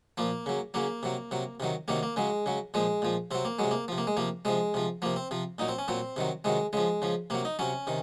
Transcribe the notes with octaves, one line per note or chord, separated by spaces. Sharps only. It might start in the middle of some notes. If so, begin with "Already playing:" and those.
A#2 F3 A#3
C#3 F#3
C#3 F#3 A#3
C3 F#3
C3 F#3
C3 D#3 F#3
C3 D#3 F#3 A#3
A#3
C#3 F#3 G#3
C#3 F#3
A#2 F3 G#3
A#2 F3
C3 F#3 C4
A#3
C3 F#3 G#3
A#3
C3 F3
A#3
G#3
C3 F3 A#3
C3 F3 G#3
C3 F3
C3 F3 A#3
C4
C3 F3
A#2 F#3 D#4
C4
C#4
A#2 F#3 C4
C3 D#3 F#3
C3 D#3 F#3 G#3
C#3 F3 G#3
C#3 F3
C3 F#3 A#3
D#4
C3 F#3 C#4
C3 D#3